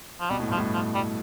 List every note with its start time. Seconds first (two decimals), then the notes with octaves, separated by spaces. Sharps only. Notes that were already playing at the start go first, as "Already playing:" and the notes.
0.20 F3
0.30 B2 G3
0.40 A2
0.48 G2 F3
0.58 A2
0.73 F3
0.94 G3